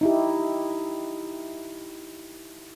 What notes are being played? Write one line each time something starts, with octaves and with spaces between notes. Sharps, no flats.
D#4 E4 G4